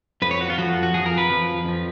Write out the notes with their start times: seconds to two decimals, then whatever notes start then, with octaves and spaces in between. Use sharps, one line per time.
0.22 F2 F3 B4
0.31 C#5
0.41 F#4
0.50 F4
0.58 F2 F3 F#4
0.83 F#4
0.94 F2 F3 G#4
1.06 A#4
1.18 B4
1.30 F2 F3
1.65 F2 F3